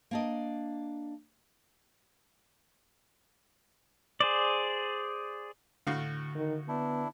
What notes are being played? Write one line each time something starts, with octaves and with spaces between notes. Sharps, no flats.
A#3 D4 D#5
G#4 C5 D5
A2 D3 F#4 F5
D#3
B3 D4 E4